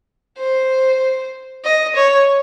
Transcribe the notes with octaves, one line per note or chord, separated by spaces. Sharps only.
C5
D#5
C#5